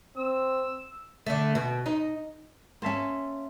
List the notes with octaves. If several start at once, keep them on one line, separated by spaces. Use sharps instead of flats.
C4 E6
D3 A3
B2
D#4
A#3 C#4 E5 A5 C6